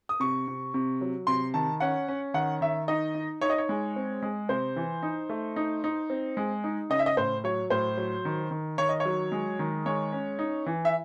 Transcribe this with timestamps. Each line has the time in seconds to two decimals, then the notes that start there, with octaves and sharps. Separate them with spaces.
0.09 D#6
0.20 C3 C#6
0.48 C3
0.74 C3
1.01 F#3
1.27 C3 C6
1.54 D#3 A5
1.80 C#4 F#5
2.08 C#4
2.34 D#3 F#5
2.61 D#3 E5
2.88 D#4 D#5
3.14 D#4
3.41 D#4 C#5
3.50 D#5
3.58 C#5
3.69 G#3
3.96 C4
4.22 G#3
4.49 C3 C5
4.76 E3
5.03 D#4
5.29 A3
5.56 D#4
5.84 D#4
6.10 C4
6.37 G#3
6.64 D#4
6.90 C#3 D#5
6.99 E5
7.06 D#5
7.17 A2 C5
7.44 F#3 C#5
7.70 A2 C5
7.97 F#3
8.25 D#3
8.51 D#3
8.78 D#3 C#5
8.89 D#5
9.00 C#5
9.05 F#3
9.32 G#3
9.59 D#3
9.86 G#3 C#5
10.12 C#4
10.39 D#4
10.66 E3
10.85 E5